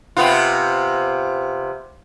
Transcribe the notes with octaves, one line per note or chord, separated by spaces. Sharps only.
C3 B3 F4